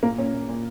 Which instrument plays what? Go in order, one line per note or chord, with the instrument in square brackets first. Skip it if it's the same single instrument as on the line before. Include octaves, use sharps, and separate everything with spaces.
[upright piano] A#2 [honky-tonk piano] A#3
[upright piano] A#2 [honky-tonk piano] C#4
[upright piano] A#2
A#2